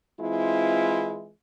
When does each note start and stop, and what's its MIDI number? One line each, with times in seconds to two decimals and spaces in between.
0.20 1.29 52
0.20 1.29 56
0.20 1.29 60
0.20 1.29 64
0.20 1.29 65